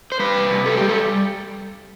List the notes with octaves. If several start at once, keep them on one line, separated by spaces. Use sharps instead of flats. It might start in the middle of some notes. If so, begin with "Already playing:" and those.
C5
G3 B4
C3
C3
G3 A4
G3 G4
A4